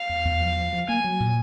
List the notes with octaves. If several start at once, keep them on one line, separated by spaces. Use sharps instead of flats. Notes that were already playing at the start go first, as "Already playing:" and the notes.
Already playing: F5
E2
E2
F3
F3
F3
A#3 G#5
F#3
A#2